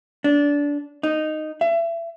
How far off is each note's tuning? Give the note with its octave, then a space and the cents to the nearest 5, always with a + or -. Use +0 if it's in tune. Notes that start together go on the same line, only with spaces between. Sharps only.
D4 -20
D#4 -10
E5 +30